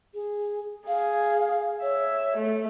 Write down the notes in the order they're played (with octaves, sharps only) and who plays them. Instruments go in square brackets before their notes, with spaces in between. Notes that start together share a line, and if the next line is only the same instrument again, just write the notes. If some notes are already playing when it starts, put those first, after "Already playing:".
[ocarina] G#4
[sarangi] G#4 [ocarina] F5
[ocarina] C#5 [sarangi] E5
[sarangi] A3